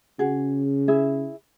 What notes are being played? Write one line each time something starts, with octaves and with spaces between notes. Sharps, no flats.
C#3 F#4 G#4
E4 G#4 E5